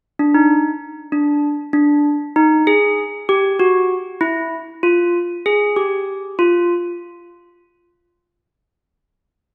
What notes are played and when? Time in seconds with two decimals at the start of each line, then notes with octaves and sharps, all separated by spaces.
0.19 D4
0.34 D#4
1.12 D4
1.73 D4
2.36 D#4
2.67 G#4
3.29 G4
3.60 F#4
4.21 E4
4.83 F4
5.46 G#4
5.76 G4
6.39 F4